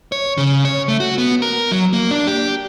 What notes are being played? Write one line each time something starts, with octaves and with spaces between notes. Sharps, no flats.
C#5
C#3
C#5
A3
F#4
B3
A#4
F#3
A#3
D4
G4